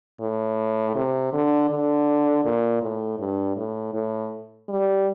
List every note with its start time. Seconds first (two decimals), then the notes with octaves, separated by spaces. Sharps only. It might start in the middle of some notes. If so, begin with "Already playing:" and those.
0.21 A2
0.95 C3
1.33 D3
1.70 D3
2.45 A#2
2.82 A2
3.19 G2
3.56 A2
3.94 A2
4.69 G3